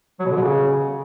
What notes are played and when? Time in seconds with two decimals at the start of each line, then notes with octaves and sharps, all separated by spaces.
0.20 F#3
0.25 B2
0.31 D3
0.36 B2
0.41 C#3